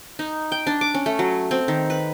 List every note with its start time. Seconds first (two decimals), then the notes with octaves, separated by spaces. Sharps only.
0.19 D#4
0.52 G5
0.67 D4
0.81 D6
0.94 C#4
1.06 A3
1.19 F#3
1.51 C4
1.68 D#3
1.90 B4